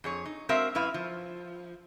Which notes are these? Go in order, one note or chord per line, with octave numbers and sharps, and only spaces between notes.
F2 G#4 C#5
D#4
G#3 C4 F#4 A#4 E5 F5
F#2 E4 B4 F5
F3